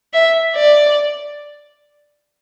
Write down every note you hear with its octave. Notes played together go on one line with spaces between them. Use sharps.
E5
D5